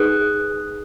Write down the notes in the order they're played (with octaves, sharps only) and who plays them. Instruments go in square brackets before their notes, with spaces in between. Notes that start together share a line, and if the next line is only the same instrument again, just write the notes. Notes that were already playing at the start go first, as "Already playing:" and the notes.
Already playing: [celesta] D#4 G#4 B4 D#6 F#6